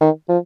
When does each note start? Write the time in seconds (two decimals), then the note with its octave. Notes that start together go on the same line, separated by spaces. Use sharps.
0.01 D#3
0.29 F3